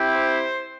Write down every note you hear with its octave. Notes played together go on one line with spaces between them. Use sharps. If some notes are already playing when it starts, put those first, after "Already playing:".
Already playing: C4 E4 G4
C5